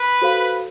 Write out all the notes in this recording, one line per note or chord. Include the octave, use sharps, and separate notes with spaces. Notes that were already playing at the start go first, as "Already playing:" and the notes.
Already playing: B4
F#4 A4 C5 F5